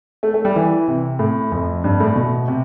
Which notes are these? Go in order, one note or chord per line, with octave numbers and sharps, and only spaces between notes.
A3
A3
G3
E3
C3
A2
F2
G2
A2
B2
C3